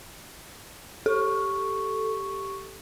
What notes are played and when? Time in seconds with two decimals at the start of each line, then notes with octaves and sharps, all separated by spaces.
1.06 G4 A4 C#6